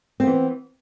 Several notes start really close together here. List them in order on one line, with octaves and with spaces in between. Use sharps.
C4 B3 E3